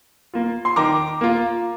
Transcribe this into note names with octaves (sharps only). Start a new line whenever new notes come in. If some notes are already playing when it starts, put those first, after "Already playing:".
A#3 F4
C6
D#3 A#5 D6
A#3 F4